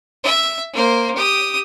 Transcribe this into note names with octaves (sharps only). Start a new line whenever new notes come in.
E5
A#3 C5
G4 D#6